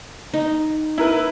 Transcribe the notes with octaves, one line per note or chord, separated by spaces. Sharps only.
D#4
E4 A#4 B4